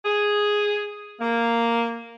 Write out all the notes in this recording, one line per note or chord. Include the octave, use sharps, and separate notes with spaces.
G#4
A#3